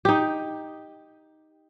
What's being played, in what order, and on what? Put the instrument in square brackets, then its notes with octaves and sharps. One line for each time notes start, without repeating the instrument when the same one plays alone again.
[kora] D#4 G4